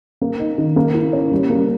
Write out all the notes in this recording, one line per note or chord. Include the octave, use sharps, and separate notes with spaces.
A#3
D#4
D#3
A#3
E4
C#4
G3
A#3